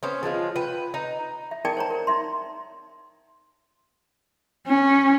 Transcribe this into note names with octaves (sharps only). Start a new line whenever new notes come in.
B3 C#4 C5
F3 G#3 E4 F4
B4 G5
D#4
E5
D#4 A#4 D5 G5 A5 D6
C5 C#5 A#5
A#4
D#4 E5 C6
C#4